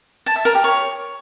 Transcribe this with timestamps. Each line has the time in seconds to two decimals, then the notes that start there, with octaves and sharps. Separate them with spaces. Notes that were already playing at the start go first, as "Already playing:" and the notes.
0.26 A5
0.36 E5
0.45 A#4
0.55 G4
0.64 C#5